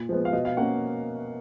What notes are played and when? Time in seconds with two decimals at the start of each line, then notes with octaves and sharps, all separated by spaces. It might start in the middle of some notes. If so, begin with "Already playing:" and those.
Already playing: A#2
0.09 F3 G#3 B3
0.25 F5
0.33 B2 D#5
0.45 F5
0.57 A#3 C#4 F#5